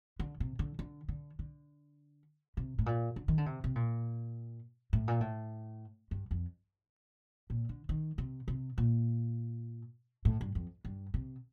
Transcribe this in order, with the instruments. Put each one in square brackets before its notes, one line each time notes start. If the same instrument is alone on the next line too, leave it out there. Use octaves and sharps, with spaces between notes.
[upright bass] D3
C3
D3
D3
D3
D3
C3
A2
A#2
D3
D#3
D3
C3
C3
A#2
A2
A#2
A2
G2
F2
A#2
D3
D#3
C3
C3
A#2
A2
G2
F2
G2
C3